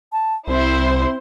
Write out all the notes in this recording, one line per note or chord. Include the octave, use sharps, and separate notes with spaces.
A5
C2 C4 E4 C5 C6